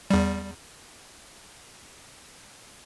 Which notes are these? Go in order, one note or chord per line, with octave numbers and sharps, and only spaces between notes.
E2 G3